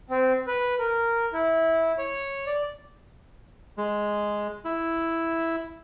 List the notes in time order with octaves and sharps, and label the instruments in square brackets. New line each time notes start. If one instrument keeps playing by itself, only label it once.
[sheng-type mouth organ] C4
B4
A#4
E4
C#5
D5
[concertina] G#3
E4